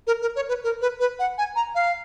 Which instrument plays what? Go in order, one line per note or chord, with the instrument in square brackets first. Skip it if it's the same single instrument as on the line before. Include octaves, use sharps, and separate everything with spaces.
[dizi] A#4
A#4
C#5
B4
A#4
B4
B4
F#5
G#5
A#5
F5